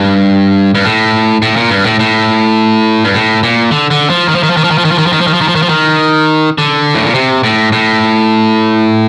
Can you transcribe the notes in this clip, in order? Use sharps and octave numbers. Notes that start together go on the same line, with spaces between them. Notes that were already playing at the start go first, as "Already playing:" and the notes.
Already playing: G2
G2
A2
A2
A#2
G2
A2
A2
G2
A2
A#2
D3
D3
F3
D#3
F3
D#3
F3
D#3
F3
D#3
F3
D#3
F3
D#3
F3
D#3
F3
D#3
F3
D#3
F3
D#3
F3
D#3
D3
A2
A#2
C3
A2
A2